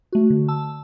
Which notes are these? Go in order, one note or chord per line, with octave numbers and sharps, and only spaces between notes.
A3 F#4
D3
A5 E6